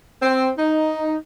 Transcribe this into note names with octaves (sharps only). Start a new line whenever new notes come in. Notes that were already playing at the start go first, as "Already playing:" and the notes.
C4
D#4